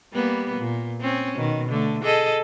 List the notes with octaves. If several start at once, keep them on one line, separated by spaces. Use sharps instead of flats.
G3 A#3 B3
A#2
C4 C#4
B2 D#3
D3 A3
G#4 A4 D#5